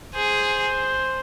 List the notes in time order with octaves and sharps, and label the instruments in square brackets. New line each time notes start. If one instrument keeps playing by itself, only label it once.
[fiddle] G#4 [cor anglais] C5